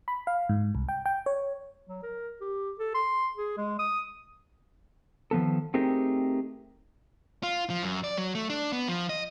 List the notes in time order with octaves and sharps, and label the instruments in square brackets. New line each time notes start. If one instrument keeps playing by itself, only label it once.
[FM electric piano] B5
F5
G#2
C2
G5
G5
C#5
[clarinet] F#3
A#4
G4
A4
C6
G#4
G#3
D#6
[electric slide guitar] D#3 F3 B3 A4
A3 C4 D#4 G4 G#4 A#4
[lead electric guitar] F4
F3
F#2
D5
F#3
A3
D4
B3
F3
D#5